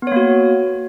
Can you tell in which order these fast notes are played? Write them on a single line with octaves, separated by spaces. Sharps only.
B3 C#5 A#3 F#4